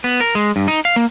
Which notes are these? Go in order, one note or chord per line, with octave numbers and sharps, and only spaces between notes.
B3
A#4
G#3
G2
D#4
F5
A#3